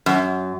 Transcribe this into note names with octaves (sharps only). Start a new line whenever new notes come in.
F#2